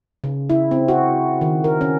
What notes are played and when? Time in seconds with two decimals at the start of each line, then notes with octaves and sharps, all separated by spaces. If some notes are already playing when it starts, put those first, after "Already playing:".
0.24 C#3
0.50 E4
0.71 C4
0.88 F#4
1.41 D#3
1.64 A#4
1.81 C#4